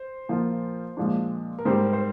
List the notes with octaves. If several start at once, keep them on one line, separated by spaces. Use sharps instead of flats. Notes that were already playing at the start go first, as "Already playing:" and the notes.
Already playing: C5
A#2 F3 A#3 F4
A#2 F3 G#3 D4
A#4
G#2 G3 C4 C5
C5